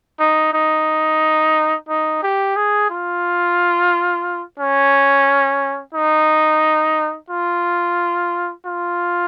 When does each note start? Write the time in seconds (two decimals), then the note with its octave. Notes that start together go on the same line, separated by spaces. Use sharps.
0.20 D#4
0.53 D#4
1.89 D#4
2.23 G4
2.56 G#4
2.90 F4
4.60 C#4
5.94 D#4
7.30 F4
8.65 F4